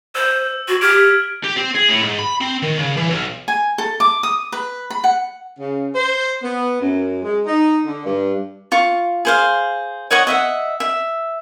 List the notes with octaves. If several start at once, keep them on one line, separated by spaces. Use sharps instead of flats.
C5 E6
F#4 G#6 F#7
G4 F6 G#6 D7
G4
C4
G#4
A2
G#2
B5
C4
D#3
C#3
E3
B1
G#5
A4
D6
D#6
B4
B5
F#5
C#3
C5
B3
F#2
G#3
D#4
D3
G2
F4 C#6
G#4 C5 F5
C#5 D#5 F#5 C#6
D#5 E5 F#5
E5